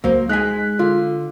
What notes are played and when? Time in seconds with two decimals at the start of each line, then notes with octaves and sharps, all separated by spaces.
0.04 C#2 F#3 A#3 C5
0.29 G#3 D#4 G#5 F#6 B6
0.79 D3 F4